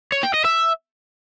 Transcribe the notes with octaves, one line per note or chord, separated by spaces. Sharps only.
C#5
G5
D#5
E5